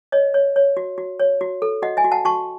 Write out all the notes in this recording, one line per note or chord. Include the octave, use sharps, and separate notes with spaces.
C#5 D#5
C#5
C#5
F#4
F#4
C#5
F#4
A4
F#4 D#5 F#5
E5 G#5
F#4
F#5 A5
F#4 A5 C#6